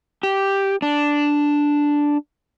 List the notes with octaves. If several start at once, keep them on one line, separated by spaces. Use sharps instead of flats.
G4
D4